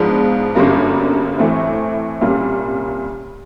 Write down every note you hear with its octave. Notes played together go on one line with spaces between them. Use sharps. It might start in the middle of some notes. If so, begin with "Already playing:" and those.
Already playing: G#2 F3 G#3 B3 D4
G1 F#2 D3 G3 A#3
A2 E3 A3 C4
C2 A#2 G3 A#3 C#4